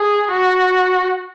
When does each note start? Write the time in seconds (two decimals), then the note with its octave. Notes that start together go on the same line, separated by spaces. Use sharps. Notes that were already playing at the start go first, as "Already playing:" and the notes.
Already playing: G#4
0.31 F#4